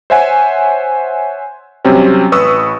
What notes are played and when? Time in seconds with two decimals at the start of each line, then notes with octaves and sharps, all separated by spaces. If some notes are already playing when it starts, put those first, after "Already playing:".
0.10 C5 C#5 E5 F#5 G#5
1.85 C3 F#3 G3 C4 C#4
2.32 A1 B4 C#6 D#6 E6